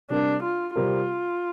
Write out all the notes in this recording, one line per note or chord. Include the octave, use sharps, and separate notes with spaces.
C3 G3 C4 D4 A#4
F4
C3 G3 C4 F4 A#4